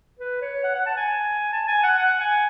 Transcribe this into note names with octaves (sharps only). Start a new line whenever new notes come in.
B4
C#5
F#5
F#5
A5
G#5
A5
G#5
F#5
F#5
G#5